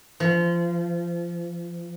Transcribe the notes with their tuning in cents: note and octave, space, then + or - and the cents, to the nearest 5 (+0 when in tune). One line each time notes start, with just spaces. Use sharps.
F3 -25